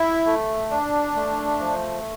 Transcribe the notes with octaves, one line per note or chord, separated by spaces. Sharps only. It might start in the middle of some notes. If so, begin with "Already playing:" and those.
Already playing: E4
A3
D4
A3
F3